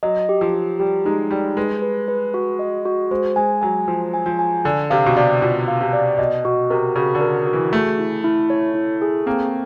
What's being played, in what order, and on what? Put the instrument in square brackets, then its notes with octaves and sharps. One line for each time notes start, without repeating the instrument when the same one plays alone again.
[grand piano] F#3 [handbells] D#5
[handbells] G4
[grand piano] F3
[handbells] G4
[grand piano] G3 [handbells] G4
[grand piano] G#3 [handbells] D#4
[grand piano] G3 [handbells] D#4
[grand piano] G#3 [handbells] B4
[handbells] B4
B4
F#4
D#5
F#4
[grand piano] G#3 [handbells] C5
[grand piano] G#3 [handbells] G#5
[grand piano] F#3 [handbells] G#5
[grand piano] F3 [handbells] C5
[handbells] G#5
[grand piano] F3
[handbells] G#5
[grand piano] D3 [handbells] A4
[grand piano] C3 [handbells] F5
[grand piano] B2
[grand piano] C3 [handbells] D5
[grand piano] B2 [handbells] F4
[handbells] F5
[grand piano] C3
[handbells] D5
[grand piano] B2 [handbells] D#5
[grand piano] B2 [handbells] F#4
[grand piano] C3 [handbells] A#4
[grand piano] C#3 [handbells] F#4
[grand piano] D3
[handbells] A#4
F#4
[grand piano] E3
[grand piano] A3 [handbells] G#4
[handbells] E4
E4
C#5
E4
G#4
[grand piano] A#3 [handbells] C4